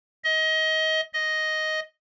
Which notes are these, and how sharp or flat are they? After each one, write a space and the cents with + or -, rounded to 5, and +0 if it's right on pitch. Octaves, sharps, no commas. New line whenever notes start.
D#5 +25
D#5 +5